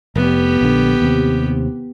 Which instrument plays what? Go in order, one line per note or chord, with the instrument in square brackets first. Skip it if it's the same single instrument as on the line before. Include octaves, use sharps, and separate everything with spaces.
[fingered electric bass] F1 [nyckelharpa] B3 G4
[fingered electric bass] A#1 D3
D#2 C3